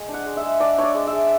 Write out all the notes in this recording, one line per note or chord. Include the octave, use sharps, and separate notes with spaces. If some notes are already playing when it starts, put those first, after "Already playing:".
Already playing: G#3 G#5
D4
F#5
G#3
E5
G#3
D4 D5
D4 C#5
D5
G#3
E5
G#3